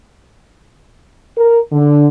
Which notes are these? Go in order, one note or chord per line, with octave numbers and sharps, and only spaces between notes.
A#4
D3